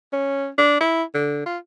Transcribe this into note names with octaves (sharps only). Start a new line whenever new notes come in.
C#4
D4
E4
D3
F4